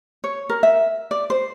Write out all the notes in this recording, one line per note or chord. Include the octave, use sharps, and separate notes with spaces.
C#5
A#4
E5
D5
C5